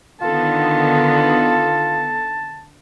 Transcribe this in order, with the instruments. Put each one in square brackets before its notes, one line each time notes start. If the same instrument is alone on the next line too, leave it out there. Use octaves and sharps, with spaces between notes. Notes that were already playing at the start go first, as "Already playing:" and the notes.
[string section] D3 D#3 B3 [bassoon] F4 [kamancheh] A4 [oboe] A5